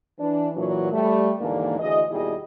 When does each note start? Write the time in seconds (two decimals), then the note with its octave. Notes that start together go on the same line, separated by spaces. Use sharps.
0.19 E3 D4
0.56 A#2 E3 F#3
0.92 G3 A3
1.40 D#2 G#2 D3 E3 A#3 D4
1.79 D2 E3 G#4 D#5
2.11 D#2 B2 G3 E4 G#4 D#5